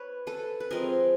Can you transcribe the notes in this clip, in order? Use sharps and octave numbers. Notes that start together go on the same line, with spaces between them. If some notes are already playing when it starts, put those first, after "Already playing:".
Already playing: B4 C#5
A4 B4
B4
F3 G#3 C4 G#4 A#4